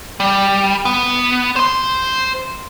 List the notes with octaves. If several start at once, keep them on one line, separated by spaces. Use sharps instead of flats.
G3
B3
C5 C6